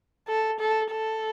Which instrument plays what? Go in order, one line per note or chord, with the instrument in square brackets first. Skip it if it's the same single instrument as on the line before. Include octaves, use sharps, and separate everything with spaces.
[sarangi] A4
A4
A4